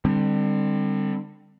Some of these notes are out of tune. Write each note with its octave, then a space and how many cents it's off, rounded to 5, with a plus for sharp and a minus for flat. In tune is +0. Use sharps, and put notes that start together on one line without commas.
D3 +30 G3 +30 C4 +0